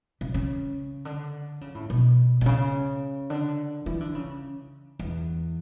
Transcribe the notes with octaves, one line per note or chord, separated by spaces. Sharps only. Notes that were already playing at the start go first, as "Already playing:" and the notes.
C#3
C#3
D3
C#3
A2
B2
B2
C#3
D3
E3
D3
C#3
E2